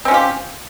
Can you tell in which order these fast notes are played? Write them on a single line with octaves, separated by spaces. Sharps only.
C4 C#4 F4 G4